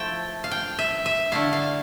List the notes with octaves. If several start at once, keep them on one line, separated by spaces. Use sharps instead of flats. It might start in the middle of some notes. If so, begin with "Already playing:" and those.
Already playing: F3 A3 E4 G5 A5
F5
G5
E5
E5
D3 A3 E4 F5
F5